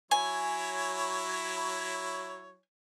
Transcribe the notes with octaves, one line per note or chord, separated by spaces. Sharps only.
F#3 E4 C#5 G#5